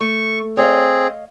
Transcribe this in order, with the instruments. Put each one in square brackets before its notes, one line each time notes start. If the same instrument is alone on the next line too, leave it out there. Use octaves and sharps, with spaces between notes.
[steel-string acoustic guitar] A3 [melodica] C#6
[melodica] C4 G#4 [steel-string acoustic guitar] C#5 D#5 F5